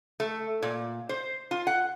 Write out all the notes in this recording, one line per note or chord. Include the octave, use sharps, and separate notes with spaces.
A3
A#2
C5
F4
F#5